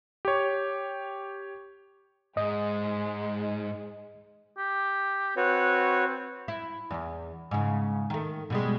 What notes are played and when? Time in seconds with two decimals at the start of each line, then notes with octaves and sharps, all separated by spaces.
0.25 G4 C#5
2.37 G#2 G#3 D#5
4.58 G4
5.37 C4 F#4 B4 C#5
6.48 E4
6.91 E2
7.51 G#2 C#3
8.10 D#3 A3
8.50 B2 G3 G#3